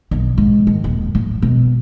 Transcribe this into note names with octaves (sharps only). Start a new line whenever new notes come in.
B1
G#2
D#3
D#1
A2
B2